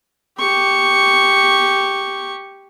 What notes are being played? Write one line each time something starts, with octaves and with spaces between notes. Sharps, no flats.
G4 C#6